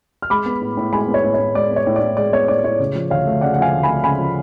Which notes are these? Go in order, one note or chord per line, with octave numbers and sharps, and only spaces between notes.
F6
G#3 B5 D6
B3
A2
A2
G#3 G#5 B5
B3
C#5
A2
C#5
A2
G#3 D5
B3
C#5
A2
D5
A2
G#3 D5
B3 C#5
A2 D5
A2 C#5
C#3
F3
D2 C#5 F5
A3
C#3 D5 F#5
F#5
F3 F5 G#5
D2
A3 G#5 B5
C#3 G#5 B5
F3